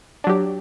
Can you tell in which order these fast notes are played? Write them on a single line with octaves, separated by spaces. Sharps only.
D4 F#3 G4